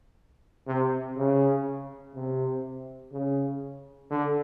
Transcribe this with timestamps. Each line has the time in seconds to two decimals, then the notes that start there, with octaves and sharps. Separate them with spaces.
0.67 C3
1.17 C#3
2.15 C3
3.12 C#3
4.10 D3